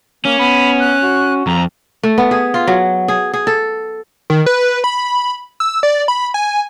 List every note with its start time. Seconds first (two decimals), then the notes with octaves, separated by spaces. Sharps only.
0.25 A#3 C#4
0.39 B3 B5
0.80 F#6
1.03 F#4
1.47 F2 A#5
2.03 A3
2.18 B3
2.31 G#4
2.54 F4
2.67 F#3
3.08 G#4
3.33 G#4
3.47 A4
4.30 D#3
4.46 B4
4.84 B5
5.60 E6
5.83 D5
6.08 B5
6.34 G#5